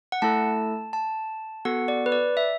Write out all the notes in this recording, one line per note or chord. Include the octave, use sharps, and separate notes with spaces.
F#5
A3 E4 A4 A5
A5
B3 F#4 A4 F#5
D5
B4
D5
E5